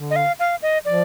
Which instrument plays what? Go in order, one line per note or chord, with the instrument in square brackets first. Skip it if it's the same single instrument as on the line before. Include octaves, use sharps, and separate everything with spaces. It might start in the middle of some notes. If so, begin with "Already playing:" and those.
Already playing: [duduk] D3
[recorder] D#5
F5
F5
D#5
[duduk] F3 [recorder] D5